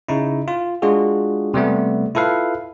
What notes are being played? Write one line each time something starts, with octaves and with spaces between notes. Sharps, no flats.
C#3 D#4 E4
F4
G#3 D4 F4 F#4 G#4
C3 G3 A3 B3
E4 F4 A4 B4 F5